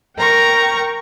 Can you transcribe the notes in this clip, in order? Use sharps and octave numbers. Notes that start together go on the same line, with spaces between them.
A#4 G5 A#5 C#6